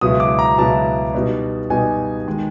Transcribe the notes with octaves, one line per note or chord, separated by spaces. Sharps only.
C#2 B2 F#3 B3 E4 D#6
D6
A#5
C#2 B2 F#3 B3 E4 A5
B2 G3 B3 D#4
B2 G3 B3 D#4 G#5
D#3 G#3